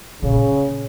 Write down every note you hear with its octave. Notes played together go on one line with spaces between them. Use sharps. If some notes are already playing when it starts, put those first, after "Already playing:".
A#2 C#3